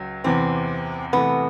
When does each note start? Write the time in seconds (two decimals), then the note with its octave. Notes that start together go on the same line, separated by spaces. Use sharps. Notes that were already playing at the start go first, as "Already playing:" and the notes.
Already playing: C#2 F#3
0.24 E2 C3 E3 C4
1.13 C3 E3 A3 B3